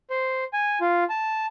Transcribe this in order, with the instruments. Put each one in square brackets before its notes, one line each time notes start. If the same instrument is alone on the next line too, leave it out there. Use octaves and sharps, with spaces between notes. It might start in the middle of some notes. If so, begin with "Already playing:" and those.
[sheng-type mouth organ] C5
G#5
F4
A5